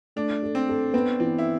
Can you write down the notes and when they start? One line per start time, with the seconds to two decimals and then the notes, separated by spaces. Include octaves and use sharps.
0.16 A3 D4
0.43 A4
0.55 C4
0.69 A4
0.94 B3 C4
1.20 E3 C4
1.38 E4